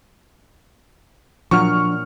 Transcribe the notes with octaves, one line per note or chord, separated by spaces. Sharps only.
A#2 F3 F#3 D4 C#6 F6